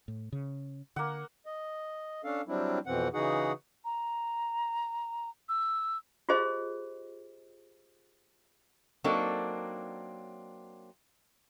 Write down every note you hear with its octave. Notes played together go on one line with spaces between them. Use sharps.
A2
C#3
D3 A#3 F#5
D#5
C#4 D4 A4 F5
F#3 G3 C4 D4 E4
F2 B2 E3 C4 F#5
C#3 E3 D#4 F#4 G#4 F#5
A#5
E6
F4 G4 G#4 C5 D#5
F#3 A#3 C4 D4 D#4 A4